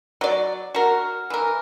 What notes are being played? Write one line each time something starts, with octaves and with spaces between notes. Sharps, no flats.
F#3 D5
F#4 A#4
E3 A#4